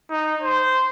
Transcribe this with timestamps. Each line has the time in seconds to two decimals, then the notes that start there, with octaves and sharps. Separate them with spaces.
0.10 D#4
0.42 C5